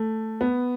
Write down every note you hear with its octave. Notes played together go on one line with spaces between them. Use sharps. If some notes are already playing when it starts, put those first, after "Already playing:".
Already playing: A3
B3